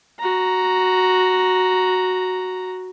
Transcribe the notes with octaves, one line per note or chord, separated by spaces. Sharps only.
F#4 A#5